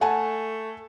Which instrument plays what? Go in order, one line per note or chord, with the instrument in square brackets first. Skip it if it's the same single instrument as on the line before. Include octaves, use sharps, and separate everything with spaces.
[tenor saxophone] A3 [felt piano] F#5 G#5 A5